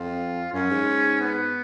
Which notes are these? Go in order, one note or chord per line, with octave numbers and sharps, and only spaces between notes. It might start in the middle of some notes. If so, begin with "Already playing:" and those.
Already playing: F2 F4
F#2 C#4
G#2
B3